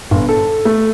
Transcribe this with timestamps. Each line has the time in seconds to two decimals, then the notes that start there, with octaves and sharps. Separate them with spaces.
0.11 G1
0.29 A4
0.65 A3